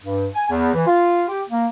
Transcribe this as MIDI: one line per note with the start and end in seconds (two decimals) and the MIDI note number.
0.04 0.27 43
0.35 0.50 80
0.50 0.73 40
0.74 0.86 52
0.87 1.23 65
1.28 1.42 67
1.51 1.66 58